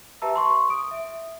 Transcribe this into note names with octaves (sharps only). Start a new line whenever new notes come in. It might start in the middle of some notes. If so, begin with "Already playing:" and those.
G4 B4 E5 A5 A#5 E6
C6 C#6
D#6 D7
E5